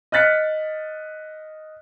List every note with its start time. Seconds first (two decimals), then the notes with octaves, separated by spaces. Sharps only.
0.12 D#5 F6 F#6 A6 B6 C#7